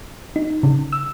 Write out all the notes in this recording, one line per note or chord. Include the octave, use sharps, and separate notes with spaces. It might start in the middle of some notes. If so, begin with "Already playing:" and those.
D#4
C#3
E6